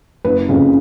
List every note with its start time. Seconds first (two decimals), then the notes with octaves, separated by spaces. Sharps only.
0.25 F#1 B4
0.49 F2 C#3